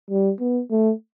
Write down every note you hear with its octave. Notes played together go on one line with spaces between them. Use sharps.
G3
B3
A3